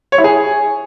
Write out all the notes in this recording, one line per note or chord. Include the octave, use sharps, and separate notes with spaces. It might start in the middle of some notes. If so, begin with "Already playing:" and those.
C#5
E4
G#4